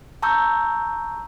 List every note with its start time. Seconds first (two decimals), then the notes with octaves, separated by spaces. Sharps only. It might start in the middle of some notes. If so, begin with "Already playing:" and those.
0.22 A5 A#5 C#6 E6 G6